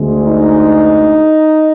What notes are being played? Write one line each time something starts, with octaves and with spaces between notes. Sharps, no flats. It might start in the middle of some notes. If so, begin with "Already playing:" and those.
Already playing: D2 D3 G#3
D#4